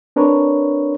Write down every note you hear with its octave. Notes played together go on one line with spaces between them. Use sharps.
C4 D4 A#4 B4 C#5